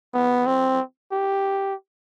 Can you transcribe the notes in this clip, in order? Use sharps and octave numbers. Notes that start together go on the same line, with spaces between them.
B3
C4
G4